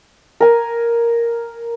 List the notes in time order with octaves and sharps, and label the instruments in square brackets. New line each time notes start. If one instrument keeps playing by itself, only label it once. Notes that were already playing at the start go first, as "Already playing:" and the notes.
[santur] A#4 G#5